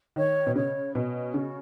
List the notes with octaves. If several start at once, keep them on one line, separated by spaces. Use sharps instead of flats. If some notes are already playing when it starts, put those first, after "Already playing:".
D#3 C#5
B2
C#3 C#5
B2 C#4
C#3 F#4